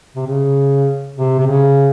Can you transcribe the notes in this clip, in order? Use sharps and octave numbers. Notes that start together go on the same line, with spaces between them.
C3
C#3
C3
C3
C#3